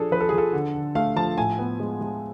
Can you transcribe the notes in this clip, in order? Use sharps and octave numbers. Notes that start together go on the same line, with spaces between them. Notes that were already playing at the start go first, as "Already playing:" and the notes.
Already playing: F3 D4 G#4 A4
F3 B4
A4
F3 G#4
A4
D3
D3
A3 F5
F3 A5
A2 G#5
B3
G#3
G#3